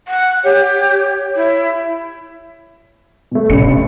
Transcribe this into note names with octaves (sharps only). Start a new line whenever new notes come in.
F#5
G4 C#5
E4
B2 A3
A1 G2 C3 C#7